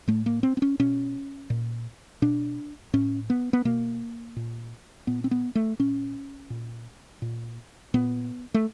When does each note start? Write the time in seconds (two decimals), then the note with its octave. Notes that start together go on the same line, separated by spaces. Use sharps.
0.08 A2 A3
0.26 A#3
0.43 C4
0.57 C4
0.62 C#4
0.79 B2 C#4
1.50 A#2
2.22 B2 D4
2.93 A2 C#4
3.30 B3
3.53 B3
3.65 B2 A#3
4.36 A#2
5.07 A#2 B3
5.24 C4
5.31 B3
5.55 A3
5.79 A#2 C#4
6.50 A#2
7.22 A#2
7.94 A#2 B3
8.54 A3